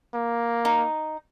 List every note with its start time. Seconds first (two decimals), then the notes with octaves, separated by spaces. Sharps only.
0.14 A#3
0.65 D#4